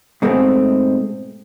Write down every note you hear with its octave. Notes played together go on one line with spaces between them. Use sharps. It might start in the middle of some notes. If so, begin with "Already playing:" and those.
G#2 B2 G#3 A3 C4